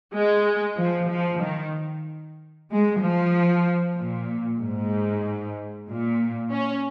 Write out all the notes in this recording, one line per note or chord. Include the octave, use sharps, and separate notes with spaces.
G#3
F3
F3
D#3
G#3
F3
A#2
G#2
A#2
C#4